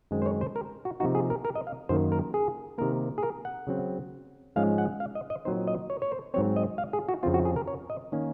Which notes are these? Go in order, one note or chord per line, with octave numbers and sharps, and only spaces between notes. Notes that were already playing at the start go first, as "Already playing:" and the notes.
F#2 D#3 G#3 C4
C5
C#5
C5
A#4
F#4
C3 F3 A#3 D#4 F#4
G#4
A#4
A#4
D#5
F5
F#2 D#3 A#3 C5
A#4
G#4
C3 D#3 A#3 A#4
G#4
A#4
F#5
C#3 F#3 C4
G#2 F3 G#3 C#4 F5
F#5
F5
D#5
D#5
A#2 F#3 C4 D#4 C5
D#5
C#5
C#5
C5
G#2 F#3 C4 C#5
D#5
F5
G#4
F#4
F2 C#3 F3 C4 F4
F#4
G#4
A#4
C#5
D#5
D#3 A#3 C#4